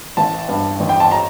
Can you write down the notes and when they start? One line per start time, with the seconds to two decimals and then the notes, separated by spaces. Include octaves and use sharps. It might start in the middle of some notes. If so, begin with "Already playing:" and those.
0.17 A1 A5
0.49 G2
0.80 A1
0.89 G5
1.00 A5
1.11 A#5